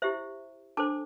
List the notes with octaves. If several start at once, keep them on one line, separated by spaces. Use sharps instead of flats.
E4 G4 C5 E5
D4 A4 C5 A5 D6